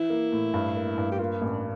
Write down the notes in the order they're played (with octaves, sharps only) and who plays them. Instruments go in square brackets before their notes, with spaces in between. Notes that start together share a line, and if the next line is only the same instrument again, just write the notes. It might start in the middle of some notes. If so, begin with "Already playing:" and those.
Already playing: [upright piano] E3 [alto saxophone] E4
[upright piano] A#3
A2
G2
A#3
G2
[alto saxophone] G4
[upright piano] A#3 [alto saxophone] F4
[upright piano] A1
[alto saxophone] D4